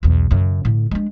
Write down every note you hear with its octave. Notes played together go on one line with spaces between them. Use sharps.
B1 E2
F#2 C#3
A2 D3
G#3 D4